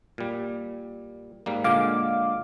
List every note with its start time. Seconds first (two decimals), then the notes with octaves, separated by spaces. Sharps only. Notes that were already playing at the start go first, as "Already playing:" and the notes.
0.18 A#2 G3
1.46 G#2 G3 A#3
1.64 A#2 D3 G#3 F5 D6